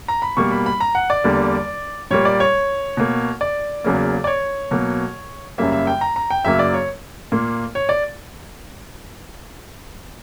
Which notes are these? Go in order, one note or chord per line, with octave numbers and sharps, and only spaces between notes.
A#5
B5
B2 G3 A#3 C#6
B5
B5
A#5
F#5
D5
E2 D3 G3 A#3
A#2 G3 A#3 C#5
D5
C#5
B2 A#3
D5
E2 C#3 F#3 A#3
D5
C#5
B2 F#3 A#3
F#2 C#3 G3 A#3 E5
E5
G5
A#5
A#5
G5
F#2 C#3 F#3 A#3 E5
D5
C#5
A#2 A#3
C#5
D5